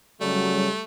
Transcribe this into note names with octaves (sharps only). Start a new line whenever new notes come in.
C#3 F#3 G3 A3